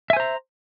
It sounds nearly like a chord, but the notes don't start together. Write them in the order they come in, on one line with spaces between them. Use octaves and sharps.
E5 G#5 C5 A#5